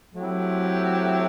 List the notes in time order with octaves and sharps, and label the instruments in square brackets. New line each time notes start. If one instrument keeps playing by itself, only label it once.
[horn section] F#3 A3 C4 E4 G4